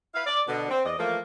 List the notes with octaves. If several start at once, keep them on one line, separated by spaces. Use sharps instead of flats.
E4 B4 F5
D5
B2 D3
C4
E2 D5 D#5
E3 F3 A3 A#3